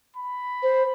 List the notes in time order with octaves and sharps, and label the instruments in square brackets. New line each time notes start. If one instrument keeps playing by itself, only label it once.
[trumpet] B5
[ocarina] C5